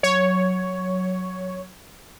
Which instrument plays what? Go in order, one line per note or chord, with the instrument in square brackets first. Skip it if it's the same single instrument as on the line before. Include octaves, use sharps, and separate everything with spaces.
[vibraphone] F#3 [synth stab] C#5